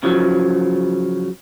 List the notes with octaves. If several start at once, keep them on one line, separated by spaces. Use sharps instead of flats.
C#3 F3 F#3